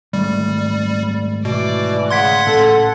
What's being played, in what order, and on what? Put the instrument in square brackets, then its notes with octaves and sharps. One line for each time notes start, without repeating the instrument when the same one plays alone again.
[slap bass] G#2 D#3 A3 [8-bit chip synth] G3
[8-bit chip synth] B2 [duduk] E3 [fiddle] D5
[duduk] C#3 [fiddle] F#5 [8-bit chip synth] C6 G#6 B6
[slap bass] A2 C#4 [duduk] A4